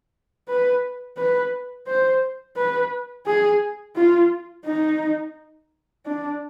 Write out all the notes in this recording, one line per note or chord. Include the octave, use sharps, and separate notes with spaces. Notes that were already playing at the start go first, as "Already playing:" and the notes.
B4
B4
C5
B4
G#4
F4
D#4
D4